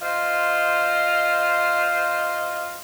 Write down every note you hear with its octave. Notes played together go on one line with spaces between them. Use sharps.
F4 C5 D#5